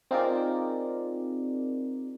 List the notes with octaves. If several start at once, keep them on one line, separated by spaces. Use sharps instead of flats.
C4 D#4 F4 G#4 A#4 D5